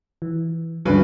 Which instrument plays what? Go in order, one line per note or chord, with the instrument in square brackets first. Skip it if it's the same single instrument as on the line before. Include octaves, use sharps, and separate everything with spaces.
[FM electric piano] E3
[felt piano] D2 G2 [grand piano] C#3 B4 [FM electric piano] F#3 G#3 D4